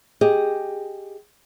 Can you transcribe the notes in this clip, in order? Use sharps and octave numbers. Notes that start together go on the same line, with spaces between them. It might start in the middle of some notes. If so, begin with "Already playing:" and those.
G4 G#4 D#5